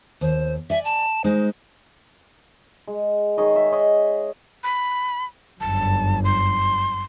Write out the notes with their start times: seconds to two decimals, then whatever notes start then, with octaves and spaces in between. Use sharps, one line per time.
0.21 D#2 C5
0.70 D5 E5 G#5
0.85 A5
1.24 G#3 D#4 C5
2.87 G#3
3.37 D#3 G#4 C#5 D#5
3.56 E5
3.72 C#5 D#5 F#5
4.64 B5
5.61 G1 F#2 A5
6.24 C6